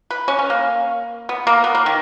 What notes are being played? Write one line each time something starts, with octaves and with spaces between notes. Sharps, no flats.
B4
C#4
C#4
A#3
B3
A#3
B3
A#3
D#3